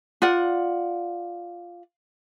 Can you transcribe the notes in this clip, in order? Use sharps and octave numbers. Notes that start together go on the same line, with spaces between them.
F4 D5 F#5